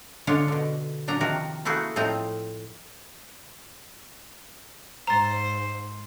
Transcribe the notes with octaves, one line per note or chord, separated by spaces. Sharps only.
D3 G#3 D4 F4 C#5
B2 D3
A#2 F#3 D4 A#5
C3 D#3 F3 F#4 A#4
A3 A#3 E4 F#4 G#4
A2 F3 C4 D#5 A#5
G#2 C5 A#5 A6